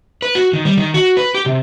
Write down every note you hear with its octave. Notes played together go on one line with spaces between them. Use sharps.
B4
F#4
D#3
G3
D#3
F#4
B4
G4
C3